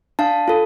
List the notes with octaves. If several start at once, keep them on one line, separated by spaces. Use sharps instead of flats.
D4 F5 A5
F4 A4